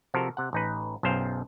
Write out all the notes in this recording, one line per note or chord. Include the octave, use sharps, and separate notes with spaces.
C3 F3 F#4 A4 A#4
C3 F#5
A1 D#4 B4
B1 F#2 G#4 C5 F5 G5